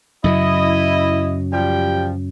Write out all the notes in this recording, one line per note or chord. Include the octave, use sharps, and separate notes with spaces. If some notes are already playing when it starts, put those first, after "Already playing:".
F#2 C#3 F#3 E4 D#5
F3 G3 G5